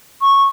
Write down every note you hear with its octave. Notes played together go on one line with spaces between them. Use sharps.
C#6